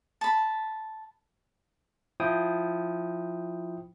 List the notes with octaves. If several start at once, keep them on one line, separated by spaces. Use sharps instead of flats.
A5 B5
F3 E4 G5 D#6